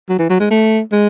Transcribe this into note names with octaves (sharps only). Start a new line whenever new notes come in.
F#3
E3
F#3
G#3
A3
G#3